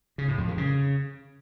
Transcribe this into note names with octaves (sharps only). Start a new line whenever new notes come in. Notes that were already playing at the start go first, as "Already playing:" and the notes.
C#3
A2
F2
D#3
C#3